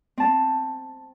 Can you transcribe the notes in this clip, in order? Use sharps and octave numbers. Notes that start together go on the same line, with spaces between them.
C4 A5